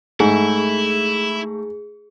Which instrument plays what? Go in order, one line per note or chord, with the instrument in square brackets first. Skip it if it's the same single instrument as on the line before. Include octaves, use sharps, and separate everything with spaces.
[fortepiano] G#2 [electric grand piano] A3 [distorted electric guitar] E4 [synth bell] G#4